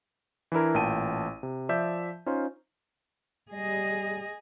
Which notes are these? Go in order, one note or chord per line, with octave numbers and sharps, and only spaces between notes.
E3 D4 E4 A#4
A1 A#2 G5 A5 D#7
C3
F3 D5 E5 G6
C#4 D#4 F4 C5
G3 G#4 D#5